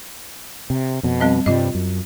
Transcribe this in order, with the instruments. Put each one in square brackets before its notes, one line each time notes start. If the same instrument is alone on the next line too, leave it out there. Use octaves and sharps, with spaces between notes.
[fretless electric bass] C3
F2 B2
[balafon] G3 C4 D#5
[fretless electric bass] G2 C3 G3 [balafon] F4 D#5
[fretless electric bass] F#2